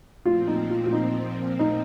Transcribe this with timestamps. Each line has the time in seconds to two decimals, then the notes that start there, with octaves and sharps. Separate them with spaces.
0.25 A#2 F3 C4 F4
0.47 D#4
0.70 F4
0.86 F4
0.93 D#4
1.59 D#4